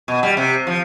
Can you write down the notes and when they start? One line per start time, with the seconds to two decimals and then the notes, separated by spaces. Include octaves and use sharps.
0.08 B2
0.23 G3
0.37 C3
0.67 F3